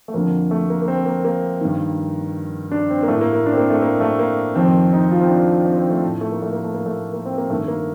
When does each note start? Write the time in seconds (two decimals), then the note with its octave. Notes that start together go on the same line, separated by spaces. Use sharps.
0.08 A3
0.14 F2 D3 A#3
0.51 A3
0.70 A#3
0.82 A#3
0.88 C4
1.06 A#3
1.25 A#3
1.61 G2 D#3
2.72 D4
2.90 C4
3.03 A#3
3.08 A2 A3
3.21 A#3
3.33 A#3
3.46 D4
3.53 C4
3.57 A#3
3.70 A3
3.82 A#3
4.00 A3
4.19 A#3
4.55 F2 D#3 C4
4.93 D#4
5.11 F4
5.21 C4
5.30 D4
5.66 C4
5.78 C4
5.90 A3
6.03 A2
6.21 A3
6.32 A#3
6.42 A3
6.53 A#3
6.64 A3
6.74 A#3
6.86 A3
7.13 A#3
7.26 C4
7.38 A#3
7.50 G2 D#3 A3
7.68 A#3